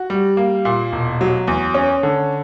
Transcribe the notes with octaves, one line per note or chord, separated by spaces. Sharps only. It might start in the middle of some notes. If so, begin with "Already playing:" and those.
Already playing: F#4
G3
A#3
A#2
E1
F#3
E2
C#4
D3